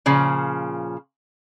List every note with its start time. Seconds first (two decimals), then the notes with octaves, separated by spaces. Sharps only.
0.06 A#2 C#3 F3